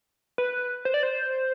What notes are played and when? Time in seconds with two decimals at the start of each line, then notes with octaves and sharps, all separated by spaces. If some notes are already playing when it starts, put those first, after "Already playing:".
0.38 B4
0.85 C5
0.94 D5
1.03 C5